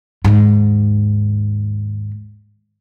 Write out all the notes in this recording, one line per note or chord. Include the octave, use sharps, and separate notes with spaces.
D#2 G#2